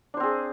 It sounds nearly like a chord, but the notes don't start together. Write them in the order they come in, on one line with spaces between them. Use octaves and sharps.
D4 C5 C4 G#4